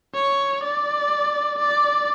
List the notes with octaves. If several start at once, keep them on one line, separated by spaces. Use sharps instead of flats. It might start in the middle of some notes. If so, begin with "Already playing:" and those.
C#5
D5
D5